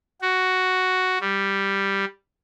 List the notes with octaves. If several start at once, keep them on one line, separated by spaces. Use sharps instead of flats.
F#4
G3